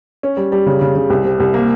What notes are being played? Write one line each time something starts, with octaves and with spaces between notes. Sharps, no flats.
C#4
G3
G3
C#3
C#3
C#3
C2
C3
C2
A#3